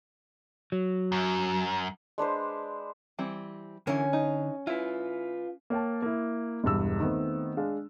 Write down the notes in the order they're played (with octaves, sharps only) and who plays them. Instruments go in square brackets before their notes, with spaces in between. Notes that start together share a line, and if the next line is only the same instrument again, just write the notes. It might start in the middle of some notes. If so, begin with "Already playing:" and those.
[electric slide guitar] F#3
[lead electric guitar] F#2
[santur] G#3 D4 B4 C5
[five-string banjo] E3 G3 C4
[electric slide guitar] D3 [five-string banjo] E3 A#4 [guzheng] C#4
[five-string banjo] D#4
[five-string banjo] E4 [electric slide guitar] F4 B4
[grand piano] A#3 C#5 G5 A5
A#3 E4
E1 E2 G2 E6
D#3 A3 B3 C4
G#3 D4 F5